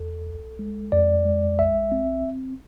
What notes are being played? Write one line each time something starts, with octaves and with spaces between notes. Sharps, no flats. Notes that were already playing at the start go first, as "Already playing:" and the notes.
Already playing: E2 A4
C2
G#3
F2 D5
G#3
A#1 E5
C4